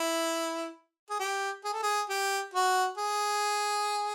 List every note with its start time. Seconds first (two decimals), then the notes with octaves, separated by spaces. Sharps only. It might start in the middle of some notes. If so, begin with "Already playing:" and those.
Already playing: E4
1.10 G#4
1.19 G4
1.64 G#4
1.73 A4
1.83 G#4
2.09 G4
2.54 F#4
2.98 G#4